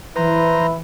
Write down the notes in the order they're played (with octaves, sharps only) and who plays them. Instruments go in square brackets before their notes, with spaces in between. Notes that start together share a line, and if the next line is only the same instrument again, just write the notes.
[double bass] E3 [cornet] E4 [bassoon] B4 [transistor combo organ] C5 A#5